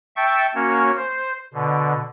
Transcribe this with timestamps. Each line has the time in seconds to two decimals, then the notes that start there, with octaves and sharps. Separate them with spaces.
0.16 E5 G5 A5 C#6
0.55 A#3 C#4 F#4 C#5
0.97 C5
1.54 B2 D3